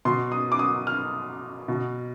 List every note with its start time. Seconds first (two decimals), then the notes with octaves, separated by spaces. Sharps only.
0.05 B2 C6
0.32 D#6
0.52 D6
0.59 D#6
0.87 F6
1.68 B2